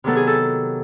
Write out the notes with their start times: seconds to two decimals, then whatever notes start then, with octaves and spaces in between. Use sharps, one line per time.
0.04 C3 D#3 F#3 B3 A4
0.16 G#4
0.27 A4